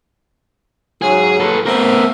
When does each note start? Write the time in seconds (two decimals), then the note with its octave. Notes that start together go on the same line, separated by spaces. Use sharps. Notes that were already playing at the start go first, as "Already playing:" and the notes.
1.02 G#2 C#3 F#3 G#4
1.40 A4 B4
1.66 A3 B3 C4 A#4